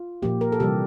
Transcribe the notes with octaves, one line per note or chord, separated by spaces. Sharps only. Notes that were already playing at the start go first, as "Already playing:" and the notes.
Already playing: F4
A#2 F3 A#3 G4
A#4
A4
C3 E3 G3 G4